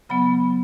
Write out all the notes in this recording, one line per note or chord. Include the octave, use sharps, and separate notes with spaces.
C#3 F#3 B3 B5